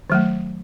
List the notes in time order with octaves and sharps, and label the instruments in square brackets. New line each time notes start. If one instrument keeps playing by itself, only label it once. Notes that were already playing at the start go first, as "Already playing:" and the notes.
[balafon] D#3 F#3 A3